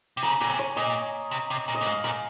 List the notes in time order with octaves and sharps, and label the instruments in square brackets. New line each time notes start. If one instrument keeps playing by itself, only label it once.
[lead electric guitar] C3
[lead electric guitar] C#3 [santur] A#5
[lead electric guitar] A#2 [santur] G#5
[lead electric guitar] C3
[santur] C#5
[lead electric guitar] A#2 [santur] D#5
[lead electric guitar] C3
C3
A#2
[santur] D#5
[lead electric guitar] A#2
[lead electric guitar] G#2 [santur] F5
[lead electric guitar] A#2 [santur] G#5